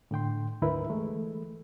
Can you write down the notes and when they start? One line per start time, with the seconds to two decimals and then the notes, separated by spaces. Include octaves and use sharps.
0.11 A2 D3 G5 C6
0.62 D2 G#2 D3 E4 A#4 B4
0.90 E3 G#3 A3